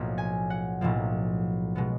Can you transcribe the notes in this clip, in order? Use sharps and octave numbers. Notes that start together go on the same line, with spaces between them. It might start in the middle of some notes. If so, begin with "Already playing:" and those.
Already playing: B1 A2 F3 A#3
G#5
F#5
B1 A2 F3 A#3
B2 G#3 B3